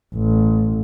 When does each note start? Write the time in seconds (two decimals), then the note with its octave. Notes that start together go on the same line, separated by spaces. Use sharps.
0.15 A1